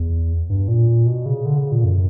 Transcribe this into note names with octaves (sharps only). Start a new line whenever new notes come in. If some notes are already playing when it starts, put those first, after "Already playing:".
Already playing: E2
G2
A#2
B2
C#3
D3
C#3
A#2
F#2